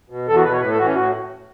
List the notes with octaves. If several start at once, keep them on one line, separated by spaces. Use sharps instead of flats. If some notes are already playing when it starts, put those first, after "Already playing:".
B2
E2 A4
F#4
B2 B4
C#5
A2 B4
A4
E3 F#4
C#4
A2 F#4